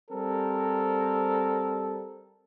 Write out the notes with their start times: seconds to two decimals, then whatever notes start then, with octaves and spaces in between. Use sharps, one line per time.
0.11 G3 C4 A4 A#4